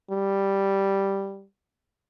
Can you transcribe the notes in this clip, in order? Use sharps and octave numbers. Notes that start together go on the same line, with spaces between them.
G3